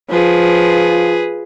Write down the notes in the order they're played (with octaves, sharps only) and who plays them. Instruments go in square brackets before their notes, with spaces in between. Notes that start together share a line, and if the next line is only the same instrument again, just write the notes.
[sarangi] F3 [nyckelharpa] G#4 B4